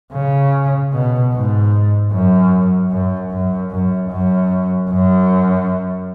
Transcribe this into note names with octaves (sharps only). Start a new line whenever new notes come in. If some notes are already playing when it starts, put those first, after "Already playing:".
C#3
B2
G#2
F#2
F#2
F#2
F#2
F#2
F#2